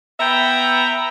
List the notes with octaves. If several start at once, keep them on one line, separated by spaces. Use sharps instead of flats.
B3 E5 G5 A#5 B5